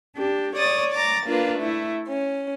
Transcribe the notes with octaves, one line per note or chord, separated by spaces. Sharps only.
D4 G4
C#5 D5 D#6 A6
A#5 D6 A6
A#3 D4 F4 B4
A3 E4
C#4